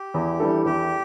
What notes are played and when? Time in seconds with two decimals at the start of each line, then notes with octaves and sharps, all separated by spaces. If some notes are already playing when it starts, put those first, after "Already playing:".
Already playing: G4
0.14 E2
0.40 E3 G3 D4 A4
0.65 E2 G4